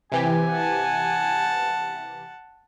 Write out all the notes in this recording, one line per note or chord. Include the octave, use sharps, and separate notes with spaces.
C3 E3 G4 G#5
F#5 A5